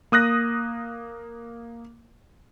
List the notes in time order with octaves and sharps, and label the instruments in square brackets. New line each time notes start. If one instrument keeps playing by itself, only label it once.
[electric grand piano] A#3 D#6 F#6 A#6